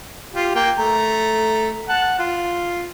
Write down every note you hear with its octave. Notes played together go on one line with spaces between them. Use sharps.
F4 G4
A#3 G5
A3 A#5
F#5 A5
F4